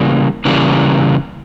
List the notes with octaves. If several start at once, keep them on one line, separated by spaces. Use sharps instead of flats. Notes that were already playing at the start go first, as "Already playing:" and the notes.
Already playing: C#3 E3 G3 A#3
C#3 E3 G3 A#3